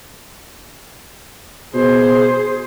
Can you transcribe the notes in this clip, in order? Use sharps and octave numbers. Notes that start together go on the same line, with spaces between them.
B2 G#4 C5